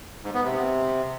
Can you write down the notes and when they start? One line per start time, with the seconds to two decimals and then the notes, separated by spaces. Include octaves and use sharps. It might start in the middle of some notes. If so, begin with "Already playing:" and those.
0.24 G#2
0.34 B3
0.44 C3